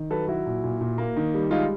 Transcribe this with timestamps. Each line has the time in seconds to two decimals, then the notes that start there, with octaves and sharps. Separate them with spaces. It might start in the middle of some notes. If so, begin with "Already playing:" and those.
Already playing: D#3
0.10 F#3 A4 B4
0.27 F#3 E4 F#4
0.46 A#2
0.64 A#2
0.81 A#2
0.98 A#3
1.16 D#3
1.34 G3
1.51 G#3 D#4 F4